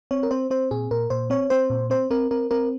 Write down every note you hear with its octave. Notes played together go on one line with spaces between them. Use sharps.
C4 C#5
A#4
C4 C5
C4 C5
A#2 G#4
A#2 A#4
A#2 C5
C4 C#5
C4 C5
A#2
C4 C5
C4 A#4
C4 A#4
C4 A#4